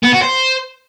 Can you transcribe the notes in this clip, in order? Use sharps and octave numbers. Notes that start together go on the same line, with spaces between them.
B3
F#4
C5